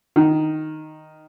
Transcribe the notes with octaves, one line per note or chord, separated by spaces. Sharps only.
D#3